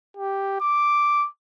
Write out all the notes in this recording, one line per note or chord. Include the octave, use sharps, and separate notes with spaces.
G4
D6